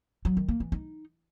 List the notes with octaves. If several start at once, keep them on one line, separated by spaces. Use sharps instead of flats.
F#3
D#3
A#3
E3
D#4